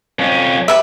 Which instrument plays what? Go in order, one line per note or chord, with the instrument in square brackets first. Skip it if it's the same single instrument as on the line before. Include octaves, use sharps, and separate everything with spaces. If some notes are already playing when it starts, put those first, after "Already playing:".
[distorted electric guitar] F2 C#4
[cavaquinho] G4 B4 E5